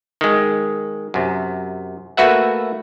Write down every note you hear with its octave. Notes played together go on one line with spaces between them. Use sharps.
D#3 G#3
F#2 C3
A3 A#3 F#4 B4 E5 F#5